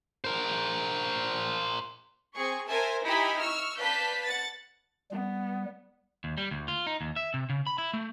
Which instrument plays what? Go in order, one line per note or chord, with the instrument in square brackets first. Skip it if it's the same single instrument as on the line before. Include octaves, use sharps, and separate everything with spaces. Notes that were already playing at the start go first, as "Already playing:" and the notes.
[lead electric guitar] A#4 C5
[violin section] C4 G#4 C#6
A#4 C5 E5 G#5 A5
D#4 E4 G4 G#5 B5
C#6 E6 F6
B4 D5 F5 A5 G6 B6
F#5 A6
[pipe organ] G3 [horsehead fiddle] B3
[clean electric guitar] D#2
G3
D2
F4
D#4
D#2
E5
C3
C#3
B5
E4
A3